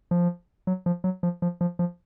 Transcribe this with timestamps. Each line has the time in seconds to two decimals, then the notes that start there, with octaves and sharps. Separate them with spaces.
0.11 F3
0.67 F#3
0.86 F3
1.04 F#3
1.23 F3
1.42 F3
1.61 F3
1.79 F3